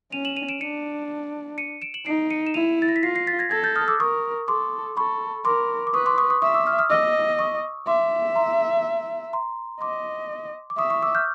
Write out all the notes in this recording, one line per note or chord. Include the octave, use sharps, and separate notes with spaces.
C#4 D#7 F7
E7 F#7
D#7 F7
D7 E7
D4 C#7 D#7
C#7 D#7
D7 E7
E7 F#7
D#4 C7 D7
C#7 D#7
E7
E4 D#7 F7
A6
A#6
B6
F4 A#6 C7
A#6 C7
A6 B6
G#6 A#6
A4 G#6 A#6
G6 A6
D#6 F6
D6 E6
A#4 C#6 D#6
A4 C6 D6
A4 B5 C#6
A#4 C6 D6
D6
B4 C#6 D#6
C6 D6
C#6 D#6
C#6 D#6
E5 C#6 D#6
D6 E6
D#6 F6
D#6 F6
D#5 D6 E6
C#6 D#6
E5 C6 D6
A#5 C6
A#5 C6
D#5 C6 D6
D6
E5 C#6 D#6
C#6 D#6
D6 E6
F6 G6